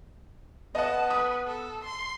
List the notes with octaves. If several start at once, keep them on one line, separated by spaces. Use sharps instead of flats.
B3 D#5 F#5 A5
B4 D#6
A4
C6